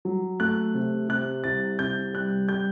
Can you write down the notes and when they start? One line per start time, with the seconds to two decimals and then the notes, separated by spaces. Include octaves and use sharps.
0.05 F#3
0.40 A3 F#6
0.74 C3
1.09 C3 F#6
1.44 C2 A6
1.79 C3 G6
2.14 G3 F#6
2.49 G3 G6